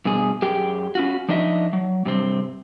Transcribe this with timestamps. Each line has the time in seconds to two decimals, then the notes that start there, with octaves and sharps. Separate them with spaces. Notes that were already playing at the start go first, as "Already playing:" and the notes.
0.05 G2 B2 G#4
0.42 F#2 G4 G#4 G5
0.95 C#4 F4 F#4
1.28 F3 D4 D#4 D#5 E5
1.73 F#3
2.05 G2 C3 C4